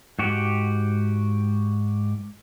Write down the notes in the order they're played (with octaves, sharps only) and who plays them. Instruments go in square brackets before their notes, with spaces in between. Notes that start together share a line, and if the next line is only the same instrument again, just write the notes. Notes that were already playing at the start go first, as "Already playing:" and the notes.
[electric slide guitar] G#2 F#4 G4